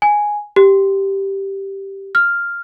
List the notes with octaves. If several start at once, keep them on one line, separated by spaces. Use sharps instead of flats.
G#5
G4
F6